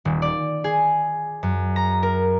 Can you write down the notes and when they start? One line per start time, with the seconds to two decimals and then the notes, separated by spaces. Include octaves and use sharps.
0.05 D#1
0.22 D5
0.64 G#4
1.43 F#2
1.76 A#5
2.03 A#4